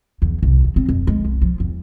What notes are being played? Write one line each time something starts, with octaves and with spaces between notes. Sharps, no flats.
E2
C2
E2
C4
F2
G#3
C2
F3
E2